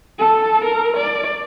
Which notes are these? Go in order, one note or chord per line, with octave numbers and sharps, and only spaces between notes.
A4
A#4
D5